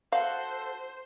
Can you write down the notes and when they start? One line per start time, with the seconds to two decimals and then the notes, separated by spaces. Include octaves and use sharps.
0.12 F#4 A4 C5 F5